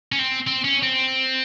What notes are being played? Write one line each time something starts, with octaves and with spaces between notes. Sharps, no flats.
C#4
C4
C4
C#4
C4